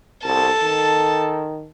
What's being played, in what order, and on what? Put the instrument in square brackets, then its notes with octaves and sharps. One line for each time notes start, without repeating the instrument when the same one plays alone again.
[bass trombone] C2 [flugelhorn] A4 [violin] A5
[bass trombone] D#3